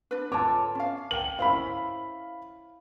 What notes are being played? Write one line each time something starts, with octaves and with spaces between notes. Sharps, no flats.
D4 B4
F4 A4 C#5 A5 D6
C#4 F5
A#4 G5 F#7
C#4 E4 C5 F5 B5